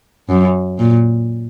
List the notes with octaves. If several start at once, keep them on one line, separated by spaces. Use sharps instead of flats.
F#2
A#2